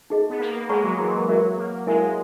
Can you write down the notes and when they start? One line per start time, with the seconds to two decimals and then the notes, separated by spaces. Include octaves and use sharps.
0.10 D#4 G#4 D#5
0.30 B3
0.40 A#3
0.69 G#3 G#4 C#5 F#5 A#5 C#6
0.84 F#3
0.99 E3
1.14 E3
1.28 F#3 F#4 A#4 C#5 E5
1.57 A#3
1.87 G#3 E4 A#4 C#5 E5 G#5